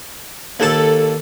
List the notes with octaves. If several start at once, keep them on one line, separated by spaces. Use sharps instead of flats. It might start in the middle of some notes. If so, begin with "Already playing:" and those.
D#2 A4 A5